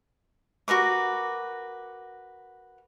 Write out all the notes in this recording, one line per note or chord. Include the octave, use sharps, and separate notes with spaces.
F#4 A#4 B4 D6